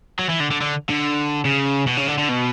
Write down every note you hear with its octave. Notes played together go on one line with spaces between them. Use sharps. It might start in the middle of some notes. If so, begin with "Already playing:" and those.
F#3
E3
D3
D3
D3
D3
C#3
B2
C#3
D3
D3
B2